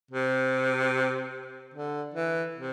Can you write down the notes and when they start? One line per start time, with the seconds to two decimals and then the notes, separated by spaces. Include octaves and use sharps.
0.11 C3
1.74 D3
2.14 E3
2.55 C3